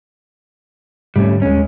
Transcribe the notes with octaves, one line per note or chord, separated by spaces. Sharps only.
G#2 D3 F#3 G3 A3 C#4
D#1 G#3 C#4